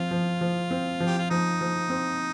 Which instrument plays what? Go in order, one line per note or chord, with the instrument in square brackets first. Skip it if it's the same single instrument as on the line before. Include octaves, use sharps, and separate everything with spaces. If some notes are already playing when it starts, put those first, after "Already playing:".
Already playing: [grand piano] F3 C4 [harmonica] F4
[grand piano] F3
F3
C4
F3
[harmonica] G4
F4
[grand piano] F3 [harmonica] D#4
[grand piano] F3
C4